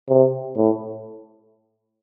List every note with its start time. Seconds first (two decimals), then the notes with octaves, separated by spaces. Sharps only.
0.09 C3
0.56 A2